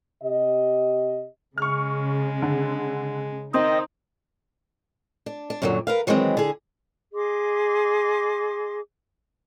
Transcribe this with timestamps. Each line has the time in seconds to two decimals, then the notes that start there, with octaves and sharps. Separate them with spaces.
0.22 C3 G4 D#5
1.58 C#3 G#3 C#6 F6
2.42 D3
3.54 D#3 C4 D#4 D#5
5.26 D4
5.50 D4
5.62 F#2 A#2 D3 D#3 F#3
5.87 A#4 B4 F5
6.07 D#3 E3 F#3 G#3 B3 C4
6.37 D3 G#4
7.15 G#4 D#5 C6 D6